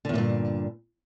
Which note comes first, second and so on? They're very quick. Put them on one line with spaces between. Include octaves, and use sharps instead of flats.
D3 E2 A#2 G2